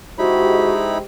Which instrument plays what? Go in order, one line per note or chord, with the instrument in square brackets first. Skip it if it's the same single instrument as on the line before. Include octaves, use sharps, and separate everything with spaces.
[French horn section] G#3 G4 C5 [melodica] D#4 E4 B5 [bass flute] F#4